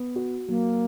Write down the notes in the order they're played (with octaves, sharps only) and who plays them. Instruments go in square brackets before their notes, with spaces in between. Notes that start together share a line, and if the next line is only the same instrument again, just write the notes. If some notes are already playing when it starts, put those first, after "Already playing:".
Already playing: [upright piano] B3
F#4
[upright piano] F#3 [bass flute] A#3